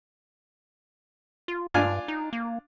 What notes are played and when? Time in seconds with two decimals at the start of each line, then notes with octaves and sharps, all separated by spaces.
1.48 F4
1.74 G2 D4 F4 G#5
2.08 D#4
2.33 A#3